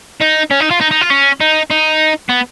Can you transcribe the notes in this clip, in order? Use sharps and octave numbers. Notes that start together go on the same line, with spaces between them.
D#4
C#4
D#4
F4
D#4
D#4
F4
C#4
D#4
D#4
B3